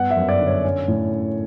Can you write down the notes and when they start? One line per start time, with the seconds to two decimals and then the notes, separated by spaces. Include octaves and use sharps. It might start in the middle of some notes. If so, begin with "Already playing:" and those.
Already playing: G2 B3 F#5
0.11 E5
0.16 F#2
0.29 D5
0.40 D3
0.47 C#5
0.64 C#4
0.88 A2
1.13 C#4